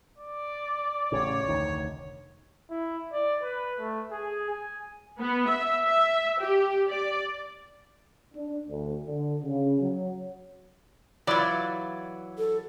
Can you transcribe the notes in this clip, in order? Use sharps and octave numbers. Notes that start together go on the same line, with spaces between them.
D5
A1 A2 C#3 C#5
F1 D2 D#3
E4
D5
B4
A3
G#4
G#5
B3
E5
E5
G4
D5
D4
D2
D3
C#3
F#3
E3 F#3 F4 B4 D5 B5 G#6
A4